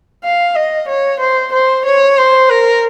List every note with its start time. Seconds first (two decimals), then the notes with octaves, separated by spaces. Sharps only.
0.24 F5
0.56 D#5
0.88 C#5
1.20 C5
1.52 C5
1.85 C#5
2.18 C5
2.49 A#4